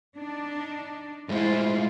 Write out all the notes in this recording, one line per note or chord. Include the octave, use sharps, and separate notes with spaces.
D4 D#4
A2 G#3 E4 F4 C5